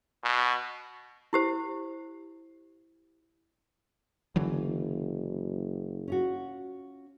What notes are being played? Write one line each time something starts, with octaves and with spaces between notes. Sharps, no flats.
B2
E4 G4 C5
F#1 D3 E3 F#3
C#4 F4 F#4